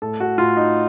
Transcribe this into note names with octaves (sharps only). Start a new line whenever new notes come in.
A2 A4
F#4
A2 F4
D#4